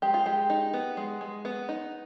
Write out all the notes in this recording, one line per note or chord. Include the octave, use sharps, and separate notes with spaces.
G#3 G4
F4
G#3 G4
D#4
B3
G#3
G#3
B3
D#4